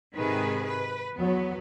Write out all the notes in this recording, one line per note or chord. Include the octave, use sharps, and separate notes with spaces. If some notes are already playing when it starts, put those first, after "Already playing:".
G#2 C3 D#3 G#4 B4
B4
E2 F#3 B3